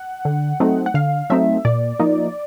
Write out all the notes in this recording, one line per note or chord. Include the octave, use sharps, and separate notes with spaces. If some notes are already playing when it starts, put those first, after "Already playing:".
Already playing: F#5
D3
F#3 A3 C4 D#4
F#5
D3 F5
F#3 A3 C4 D#4 E5
A#2 D5
F3 A#3 D#4